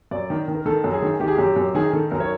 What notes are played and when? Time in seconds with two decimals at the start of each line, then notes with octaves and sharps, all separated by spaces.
0.11 F#2 D5
0.30 D#3
0.48 D#3
0.55 A#4
0.66 D#3 A4
0.84 F#2
0.93 G#4
1.02 D#3
1.20 D#3 G4
1.27 G#4
1.35 F#2 G4
1.56 F#2
1.75 D#3 G#4
1.93 D#3 A4
2.11 F#2 A#4
2.20 C#5